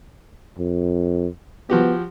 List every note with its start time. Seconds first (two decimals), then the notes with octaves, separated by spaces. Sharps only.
0.58 F2
1.70 F3 B3 F#4 G4